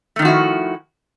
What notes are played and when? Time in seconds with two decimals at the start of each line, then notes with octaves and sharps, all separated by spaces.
0.16 A3
0.19 D#3
0.22 F3
0.25 F#4
0.28 E4